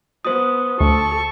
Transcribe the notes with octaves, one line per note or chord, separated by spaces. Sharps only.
B3 C5 D#6
D2 A4 C#6